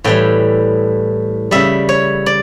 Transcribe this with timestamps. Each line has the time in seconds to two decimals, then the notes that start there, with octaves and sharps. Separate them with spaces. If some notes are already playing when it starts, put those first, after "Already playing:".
0.04 A2 E3 G3 G5
1.51 C#3 G3 E5
1.89 C#5
2.26 D5